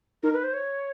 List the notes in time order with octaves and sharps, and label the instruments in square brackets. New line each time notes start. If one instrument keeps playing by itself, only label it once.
[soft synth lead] D#4 [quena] A#4
[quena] B4
C5
C#5